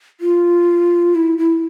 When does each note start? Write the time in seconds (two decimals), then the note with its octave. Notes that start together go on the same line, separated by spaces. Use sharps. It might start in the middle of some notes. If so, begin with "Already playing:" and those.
0.20 F4
1.15 E4
1.38 E4